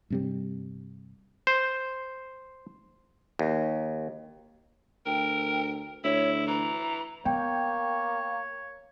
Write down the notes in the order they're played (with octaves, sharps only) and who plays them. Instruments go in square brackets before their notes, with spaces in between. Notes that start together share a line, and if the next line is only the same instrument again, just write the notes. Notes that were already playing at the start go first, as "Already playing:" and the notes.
[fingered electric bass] G2 C3 G3
[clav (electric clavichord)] C5
D#2
[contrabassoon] D2 [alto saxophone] A#4 [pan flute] G5
[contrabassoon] D2 [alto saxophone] E4 [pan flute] C#5
[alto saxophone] E3 [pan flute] A#5
[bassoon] A#3 [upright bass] B3 [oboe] C#5 [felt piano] G5